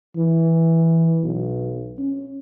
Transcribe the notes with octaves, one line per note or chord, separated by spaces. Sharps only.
E3
B1
C#4